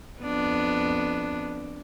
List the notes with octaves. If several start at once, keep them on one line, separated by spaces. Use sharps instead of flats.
F2 B3 D4